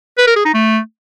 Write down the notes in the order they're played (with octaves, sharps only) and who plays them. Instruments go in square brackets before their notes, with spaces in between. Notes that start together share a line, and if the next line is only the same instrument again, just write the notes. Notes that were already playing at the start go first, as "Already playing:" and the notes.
[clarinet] B4
A#4
G#4
D#4
A3